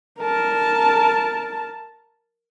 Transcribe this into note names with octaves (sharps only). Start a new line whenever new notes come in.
A#4 A5